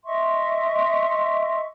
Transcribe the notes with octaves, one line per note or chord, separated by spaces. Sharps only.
D#5 E5 C6 C#6